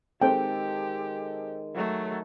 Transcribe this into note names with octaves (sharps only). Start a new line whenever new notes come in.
D#3 G#3 C4 G4 A4 G5
F#3 A3